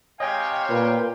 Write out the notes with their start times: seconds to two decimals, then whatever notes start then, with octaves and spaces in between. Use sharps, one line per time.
0.20 C3 C#5 D#5 F5 G5 G#5
0.70 A#2 B4